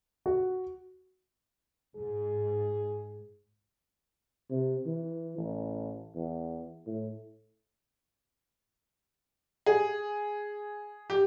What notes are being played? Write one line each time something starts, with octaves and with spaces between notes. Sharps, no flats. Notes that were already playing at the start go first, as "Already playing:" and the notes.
F#4
G#2 G#4
C3
E3
A1
E2
A2
G#4
G4